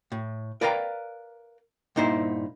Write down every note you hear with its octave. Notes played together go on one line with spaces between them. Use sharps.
A2
A#4 B4 D5 F5 G5 A#5
G2 A#2 D#4 E4 C5